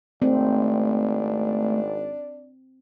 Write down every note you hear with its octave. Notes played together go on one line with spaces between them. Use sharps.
G#1 A3 C4 D4